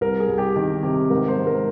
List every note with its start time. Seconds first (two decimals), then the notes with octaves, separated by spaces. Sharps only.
0.01 C2 A#4
0.20 G#4
0.29 C2
0.38 G4
0.56 D#3 G4
0.83 C3 G4
1.10 G#2 A#4
1.28 C5
1.38 G#2
1.47 A#4